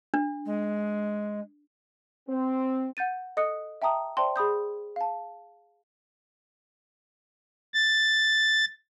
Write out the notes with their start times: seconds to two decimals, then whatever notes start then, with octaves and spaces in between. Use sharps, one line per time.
0.14 D4
0.45 G#3
2.28 C4
2.97 F#5 G6 A6 D#7
3.37 A4 D#5 D#6 F#6 C#7
3.82 E5 G5 A5 A#5 D#6
4.17 C5 D5 E5 G5 A5 C6
4.36 G#4 B5 D#6 G6
4.96 F5 A5
7.74 A6